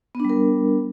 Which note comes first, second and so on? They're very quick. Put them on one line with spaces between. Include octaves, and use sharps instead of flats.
B3 D4 G3 A#4